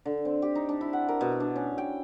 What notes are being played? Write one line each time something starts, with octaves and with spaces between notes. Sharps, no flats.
D3
C4
G4
D#4
D4
E4
F#5
A#4
B2
D4
C#4
G5